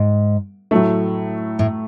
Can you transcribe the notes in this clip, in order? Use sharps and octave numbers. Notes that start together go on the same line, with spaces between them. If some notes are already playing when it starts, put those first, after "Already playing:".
Already playing: G#2
A2 F#3 A3
A2